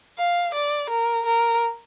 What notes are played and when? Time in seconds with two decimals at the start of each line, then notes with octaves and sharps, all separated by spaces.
0.18 F5
0.54 D5
0.90 A#4
1.26 A#4